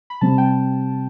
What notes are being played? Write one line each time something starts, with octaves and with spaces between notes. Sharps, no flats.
B5
C3 G3 C4 A5
G5